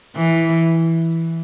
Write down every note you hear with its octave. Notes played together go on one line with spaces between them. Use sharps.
E3